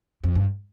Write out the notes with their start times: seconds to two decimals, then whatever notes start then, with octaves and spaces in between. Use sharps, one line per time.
0.24 F2
0.35 G2